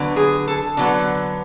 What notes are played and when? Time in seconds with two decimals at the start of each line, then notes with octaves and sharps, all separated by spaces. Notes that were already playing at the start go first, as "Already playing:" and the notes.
Already playing: D3 F#3 B3
0.16 G#4
0.48 A4
0.77 D3 F#3 B3